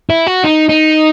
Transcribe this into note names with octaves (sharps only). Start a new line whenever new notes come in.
E4
F#4
D#4
D#4